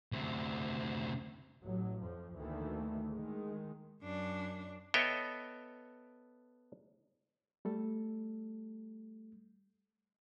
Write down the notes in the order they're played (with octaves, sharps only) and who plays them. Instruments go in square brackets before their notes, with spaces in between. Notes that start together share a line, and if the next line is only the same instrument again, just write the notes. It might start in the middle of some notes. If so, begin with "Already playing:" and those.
[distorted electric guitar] D2 C3
[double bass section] A1 F#3
F2 F3
D2 D#3 E3 A3 A#3
D#3 G#3
[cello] F#2 D4
[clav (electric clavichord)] B3 A4 C#5 D#5 E5 G5
[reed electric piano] G3 A3 A4